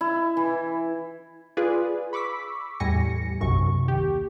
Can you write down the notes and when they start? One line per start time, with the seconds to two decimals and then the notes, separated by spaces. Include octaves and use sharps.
0.01 E4
0.37 E3
1.57 F4 G#4 B4 D5
2.13 B5 C#6 D6 E6 B6
2.80 E2 A2 G3 G#5 A#6 C#7
3.41 B1 F#2 C3 C#6
3.85 D#2 G4